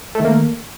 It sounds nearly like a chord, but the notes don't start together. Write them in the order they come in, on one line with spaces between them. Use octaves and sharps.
A3 D#3 A#3